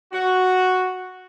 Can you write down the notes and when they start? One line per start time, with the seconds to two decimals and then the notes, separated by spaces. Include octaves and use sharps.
0.13 F#4